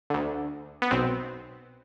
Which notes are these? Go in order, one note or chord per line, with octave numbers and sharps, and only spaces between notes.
D2 D3
B3
B1 B2 C4